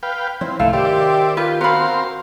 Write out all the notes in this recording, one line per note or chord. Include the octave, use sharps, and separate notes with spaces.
B4 F5 G5
F3 C4 E4
C2 G#2 C#3 A3 E4 F5
D#3 G4 C5 D5 E5
F4 G4 B4
C4 F#4 A#4 C5 F5 B5